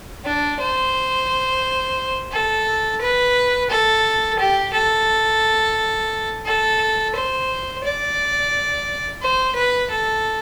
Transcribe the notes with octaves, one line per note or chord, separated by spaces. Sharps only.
D4
C5
A4
B4
A4
G4
A4
A4
C5
D5
C5
B4
A4